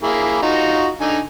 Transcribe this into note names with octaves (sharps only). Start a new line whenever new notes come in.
A#3 E4 G#4
D#4 F4 F#4
D3 D#4 G#5